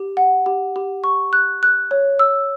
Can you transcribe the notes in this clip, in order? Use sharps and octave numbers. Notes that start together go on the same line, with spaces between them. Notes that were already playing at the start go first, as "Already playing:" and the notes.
Already playing: G4
F#5
G4
G4
C#6
F#6
F#6
C#5
E6